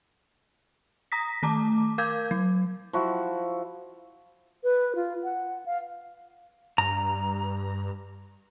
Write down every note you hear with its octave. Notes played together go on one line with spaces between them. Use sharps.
A#5 D#6 A#6 B6
D#3 A3 A5 A#5 D6
A#4 F5 D6 G6 G#6
F#3
F3 E4 F#4
B4
F4
F#5
F5
G2 A#5